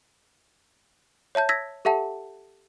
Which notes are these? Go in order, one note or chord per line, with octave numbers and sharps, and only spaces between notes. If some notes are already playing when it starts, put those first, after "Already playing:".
C#5 E5 A5 G6
E6 G#6 A#6 B6
G4 A4 E5 F#5 A5